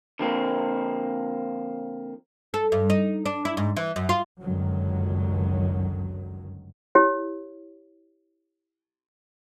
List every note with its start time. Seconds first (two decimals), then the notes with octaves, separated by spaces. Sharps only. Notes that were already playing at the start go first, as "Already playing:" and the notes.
0.19 D3 F3 A#3 C4
2.54 A4
2.72 G2
2.90 D#4
3.26 D4
3.45 E4
3.57 G#2
3.77 E3
3.96 F#2
4.09 F4
4.41 G1 C#2 F#2 D3 D#3 F#3
6.95 E4 G4 C#5